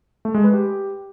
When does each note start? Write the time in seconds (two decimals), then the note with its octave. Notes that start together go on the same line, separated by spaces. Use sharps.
0.25 A3
0.34 G#3
0.44 B4
0.53 G4